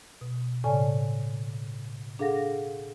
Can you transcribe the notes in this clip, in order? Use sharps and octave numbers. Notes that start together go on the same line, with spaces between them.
B2
A2 C#3 A4 D5 G#5 A5
D4 G#4 A4 F5 F#5 A#6